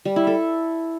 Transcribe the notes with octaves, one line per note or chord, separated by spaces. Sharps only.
G3
E4
A4